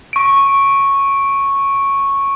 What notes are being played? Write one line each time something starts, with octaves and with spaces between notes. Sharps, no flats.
C#6 D7